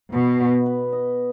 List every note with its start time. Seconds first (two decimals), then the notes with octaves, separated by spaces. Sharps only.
0.12 B2 B3
0.40 D#5
0.66 B4
0.92 D#5